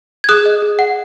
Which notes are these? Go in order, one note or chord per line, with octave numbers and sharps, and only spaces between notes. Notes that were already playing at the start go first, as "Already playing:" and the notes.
G#6
G#4 D#6 F#6
D#5
G#4
F#5